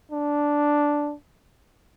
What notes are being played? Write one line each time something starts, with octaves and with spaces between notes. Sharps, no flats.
D4